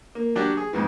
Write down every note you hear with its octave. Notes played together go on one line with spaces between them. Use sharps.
A#3
F#3 D4 F#4 G4
G#4
F2 G#2 E3